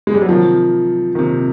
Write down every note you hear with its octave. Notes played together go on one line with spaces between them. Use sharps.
G#3
G3
F#3
C3 D#3 F3
C3 D#3